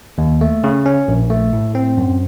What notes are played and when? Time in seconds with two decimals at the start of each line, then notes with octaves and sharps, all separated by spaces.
0.18 D#2
0.41 A3
0.64 C#3
0.86 C#4
1.08 A#1
1.30 A3
1.53 A2
1.75 C4
1.97 F#2